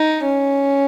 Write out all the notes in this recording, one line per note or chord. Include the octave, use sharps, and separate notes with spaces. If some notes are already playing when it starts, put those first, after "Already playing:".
Already playing: D#4
C#4